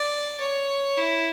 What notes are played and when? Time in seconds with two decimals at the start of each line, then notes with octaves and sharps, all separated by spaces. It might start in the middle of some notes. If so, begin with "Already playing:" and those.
Already playing: D5
0.40 C#5
0.97 E4